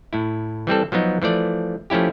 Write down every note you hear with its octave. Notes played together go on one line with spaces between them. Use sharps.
A2 E4
E3 G3 C4 A4
F3 F#3 B3 D#4
E3 F3 A3 D5
F3 A3 C#4 E4 G4